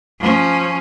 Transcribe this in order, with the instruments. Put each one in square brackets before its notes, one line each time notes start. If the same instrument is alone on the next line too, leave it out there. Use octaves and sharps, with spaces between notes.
[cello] F3 C#4